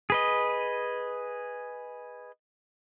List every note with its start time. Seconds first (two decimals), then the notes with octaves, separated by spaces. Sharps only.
0.10 G#4 B4 D#5